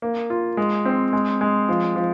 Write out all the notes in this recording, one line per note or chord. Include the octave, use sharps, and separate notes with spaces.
A#3
F4
G#3
C4
G#3
G#3
F3
F3